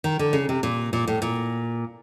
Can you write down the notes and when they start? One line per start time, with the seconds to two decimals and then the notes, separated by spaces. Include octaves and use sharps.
0.04 D#3
0.19 D3
0.33 C#3
0.49 C3
0.63 A#2
0.93 A#2
1.08 A2
1.22 A#2